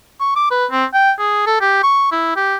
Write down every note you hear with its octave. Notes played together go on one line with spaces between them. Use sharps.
C#6
D6
B4
C4
G5
G#4
A4
G4
C#6
E4
G4